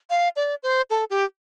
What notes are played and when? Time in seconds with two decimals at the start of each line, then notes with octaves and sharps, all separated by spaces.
0.10 F5
0.36 D5
0.63 C5
0.90 A4
1.10 G4